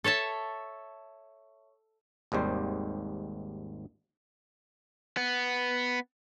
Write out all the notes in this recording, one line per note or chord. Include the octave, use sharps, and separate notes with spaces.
A4 C#5 E5 A5
G#1 D#2 G#2 G3 C5
B3